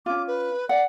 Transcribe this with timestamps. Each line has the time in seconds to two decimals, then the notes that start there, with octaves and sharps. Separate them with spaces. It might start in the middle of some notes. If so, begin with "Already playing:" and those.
0.06 C#4 F4 D6
0.28 B4
0.69 D5 F#5